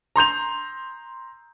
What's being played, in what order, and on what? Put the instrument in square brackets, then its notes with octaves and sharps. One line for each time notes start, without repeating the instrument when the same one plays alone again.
[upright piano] A#5 C6 G6 F7